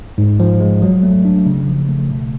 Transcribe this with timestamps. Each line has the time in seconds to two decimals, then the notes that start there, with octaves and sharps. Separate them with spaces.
0.18 G#2
0.40 F3
0.60 G#3
0.82 F#3
1.03 A3
1.25 D4
1.46 C#3
1.68 F3
1.89 A3
2.11 B2